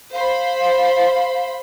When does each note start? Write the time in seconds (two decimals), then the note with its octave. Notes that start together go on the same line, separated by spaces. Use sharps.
0.13 C5 F5 B5